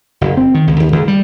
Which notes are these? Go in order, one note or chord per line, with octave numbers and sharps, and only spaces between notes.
F#1
C4
D#3
C#2
D#2
C#2
G3